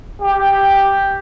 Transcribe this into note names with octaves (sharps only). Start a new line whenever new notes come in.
G4